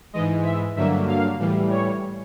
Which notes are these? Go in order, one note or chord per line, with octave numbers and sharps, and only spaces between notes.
G#2 E3 G#3 D#5
E5
G2 D3 F#3 A#3 E5
F5
A2 E3 G3
C#5